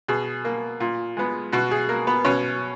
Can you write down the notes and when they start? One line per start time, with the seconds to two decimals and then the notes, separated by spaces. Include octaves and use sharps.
0.08 B2 G#4
0.45 A#3
0.80 A#2
1.17 G#3 B3
1.52 B2 F#4
1.71 G#4
1.89 A#3 A#4
2.07 B3 B4
2.25 B2 C#4 C#5